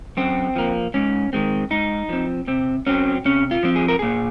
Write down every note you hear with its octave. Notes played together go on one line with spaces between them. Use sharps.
F#2 C4
F3 A#3
G#2 C#4
D#3 G#3 C4
G#2 D#4
F3 C4
C3 C4
F#3 C4 C#4
C3 C#4
F4
F3 C4
G#4
A#4
A#2 G#4